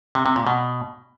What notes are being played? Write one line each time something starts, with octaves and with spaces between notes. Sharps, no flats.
C3
C3
A#2
B2